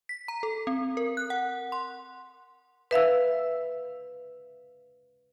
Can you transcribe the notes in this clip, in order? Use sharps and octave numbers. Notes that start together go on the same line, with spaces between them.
B6
A#5
A4
C4
A#4
F#6
F#5
C6
B4 E5 F5 E6